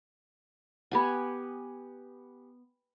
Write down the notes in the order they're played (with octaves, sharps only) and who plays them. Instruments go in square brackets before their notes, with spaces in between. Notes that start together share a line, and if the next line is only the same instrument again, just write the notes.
[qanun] B3 G4 G#5 [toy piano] F#5 B5